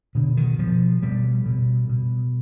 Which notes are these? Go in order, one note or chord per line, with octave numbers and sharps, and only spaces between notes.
B2 D3
D#3
B2 F3
B2 G3
B2
B2